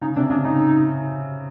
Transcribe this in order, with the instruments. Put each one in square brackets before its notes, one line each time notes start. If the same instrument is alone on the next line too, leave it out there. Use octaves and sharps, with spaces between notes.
[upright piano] C#3 [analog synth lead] D#4
[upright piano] C3 [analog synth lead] D4
[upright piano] C#3 [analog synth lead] D4
[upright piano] C#3 [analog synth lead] D#4